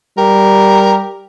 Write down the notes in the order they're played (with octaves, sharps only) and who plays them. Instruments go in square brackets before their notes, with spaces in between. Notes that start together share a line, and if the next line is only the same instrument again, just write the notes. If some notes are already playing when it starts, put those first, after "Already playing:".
[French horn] G3 [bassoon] G4 [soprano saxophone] A#4